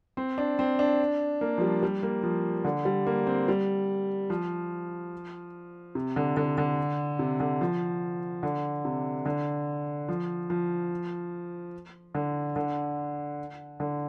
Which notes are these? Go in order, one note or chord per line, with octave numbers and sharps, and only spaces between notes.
C4
D4
C4
D4
A#3
F3
G3
G3
A#3
F3
D3
G3
A#3
C4
G3
F3
C3
D3
D3
D3
C3
D3
F3
D3
C3
D3
F3
F3
D3
D3
D3